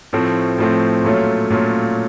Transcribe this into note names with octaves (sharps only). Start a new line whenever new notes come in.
A2 F3 A3 C4
A2 F3 A3 C4
A#2 F#3 A3 C#4 F4
A#2 F#3 A3 C#4 F4